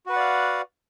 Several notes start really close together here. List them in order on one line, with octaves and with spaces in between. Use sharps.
F#4 B4 F#5 D5 F5